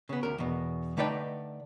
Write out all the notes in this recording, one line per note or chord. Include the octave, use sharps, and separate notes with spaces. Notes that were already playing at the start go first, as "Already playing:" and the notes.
C#3 B3
D2 A#4
E2 B2
D3 A3 D#4 B4 D5 G5